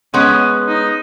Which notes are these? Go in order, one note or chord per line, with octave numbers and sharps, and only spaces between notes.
G#3 B3 C#4
D#4